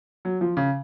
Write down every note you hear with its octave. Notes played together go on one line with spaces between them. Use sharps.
F#3
F3
C#3